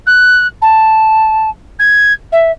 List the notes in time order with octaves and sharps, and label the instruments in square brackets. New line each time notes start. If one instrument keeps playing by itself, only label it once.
[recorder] F#6
A5
G#6
E5